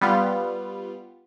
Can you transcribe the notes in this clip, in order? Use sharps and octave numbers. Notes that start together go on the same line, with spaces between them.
G3 B3 F4